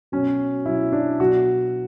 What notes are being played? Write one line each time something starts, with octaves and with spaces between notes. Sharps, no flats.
B2 F#3 C#4
B2 F#3 E4
D4
B2 F#3 F#4